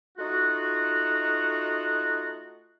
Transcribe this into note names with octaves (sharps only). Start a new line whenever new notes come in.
A3 D#4 F4 F#4